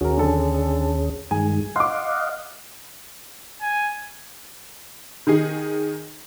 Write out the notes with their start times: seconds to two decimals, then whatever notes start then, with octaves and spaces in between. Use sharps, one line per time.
0.01 D#2 C#4 F#4 G#4 A#4
0.17 D3 A4
1.31 G2 D#3 G#3 G#5
1.76 D#5 F5 F#5 C6 D6
3.62 G#5
5.27 D#3 D#4 G#4